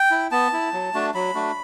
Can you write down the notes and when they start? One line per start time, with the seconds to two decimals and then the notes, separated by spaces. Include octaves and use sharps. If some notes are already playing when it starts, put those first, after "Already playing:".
Already playing: G5
0.11 E4
0.31 B3 A5
0.53 E4
0.73 F#3
0.94 A3 D4 F#4
1.15 F#3 B5
1.35 A3 D4 F#4